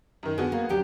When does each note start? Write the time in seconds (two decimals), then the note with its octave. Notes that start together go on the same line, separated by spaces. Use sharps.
0.23 F#2 D#3
0.38 D3 B3 F#4 G#4
0.52 A#3
0.69 D2 F#3 G4